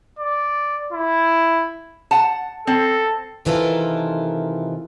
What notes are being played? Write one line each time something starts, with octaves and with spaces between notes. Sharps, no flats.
D5
E4
F#5 A5
C4 A4
C3 D#3 E3 F4 A4 A#4